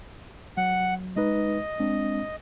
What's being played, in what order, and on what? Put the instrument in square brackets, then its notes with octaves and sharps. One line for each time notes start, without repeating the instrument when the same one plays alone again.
[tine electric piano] F#3 [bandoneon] F#5
[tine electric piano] G#3 D#4 B4 [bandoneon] D#5
[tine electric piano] G#3 C4 D4